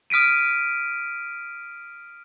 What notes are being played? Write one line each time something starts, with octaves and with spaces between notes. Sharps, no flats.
D#6 F6 B6 D7 D#7